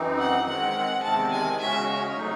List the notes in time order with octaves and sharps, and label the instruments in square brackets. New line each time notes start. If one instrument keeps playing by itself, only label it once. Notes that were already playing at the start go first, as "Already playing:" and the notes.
Already playing: [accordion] F#2 E3 C4 D#4
[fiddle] F#5
[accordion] D#3 G#3 C4 [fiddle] F#5
[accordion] E2 C3 D#3 G#3 C4 [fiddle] A5
[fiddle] G#5
[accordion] C#3 G#3 C#4 F#4 [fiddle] E5
[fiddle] C#5
[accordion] C3 F#3 A3 D#4